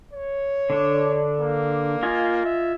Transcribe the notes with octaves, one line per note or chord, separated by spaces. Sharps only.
C#5
D3 D4
A#3
F4 D#5 G#5
E5